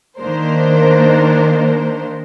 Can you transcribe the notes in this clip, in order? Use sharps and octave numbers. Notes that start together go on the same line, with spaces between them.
D#3 A#3 D4 A#4 C5